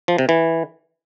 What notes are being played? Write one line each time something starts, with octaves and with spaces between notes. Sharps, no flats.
F3
C3
E3